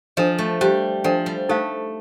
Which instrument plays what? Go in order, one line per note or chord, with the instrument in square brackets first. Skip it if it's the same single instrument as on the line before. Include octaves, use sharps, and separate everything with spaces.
[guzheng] F3 [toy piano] D4 A4 D#5
[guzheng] A3
[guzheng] G3 [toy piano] G4 C5 G5
[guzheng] F3 [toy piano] D4 A4 D5 G5
[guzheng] G3
[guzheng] A3 [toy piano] D#4 A4 C5 F5